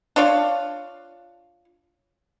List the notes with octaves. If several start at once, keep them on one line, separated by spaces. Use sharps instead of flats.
D4 F4 C#5 F5